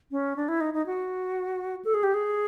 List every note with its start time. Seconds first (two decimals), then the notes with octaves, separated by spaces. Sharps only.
0.11 C#4
0.36 D4
0.49 E4
0.61 D#4
0.74 D#4
0.86 F#4
1.85 A4
1.94 G#4
2.04 G4
2.14 G#4